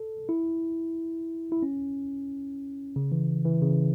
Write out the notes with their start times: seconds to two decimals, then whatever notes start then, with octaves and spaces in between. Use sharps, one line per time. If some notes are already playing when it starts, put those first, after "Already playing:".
Already playing: A4
0.29 E4
1.52 E4
1.63 C#4
2.96 C#3
3.12 E3
3.45 E3
3.62 C#3